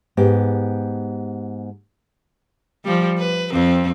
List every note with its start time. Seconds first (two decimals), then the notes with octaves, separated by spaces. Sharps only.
0.17 G#2 B3 G4
2.85 F3 G3
3.18 B4
3.53 F2 C4